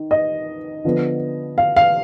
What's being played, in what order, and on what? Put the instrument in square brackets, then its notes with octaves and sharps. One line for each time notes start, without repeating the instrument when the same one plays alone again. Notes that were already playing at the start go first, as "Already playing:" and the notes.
Already playing: [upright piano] D#3
D#5
D3 F3 B3
F5
F5